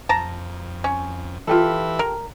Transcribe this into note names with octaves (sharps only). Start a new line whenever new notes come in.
F2 A5 A#5
C#4
E3 F4 G4 A4 B4 E5
A#4